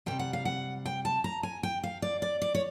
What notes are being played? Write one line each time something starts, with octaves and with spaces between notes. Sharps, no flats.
C3 E3 G3 G5
F#5
F5
F#5
G5
A5
A#5
G#5
G5
F5
D5
D5
D5
C#5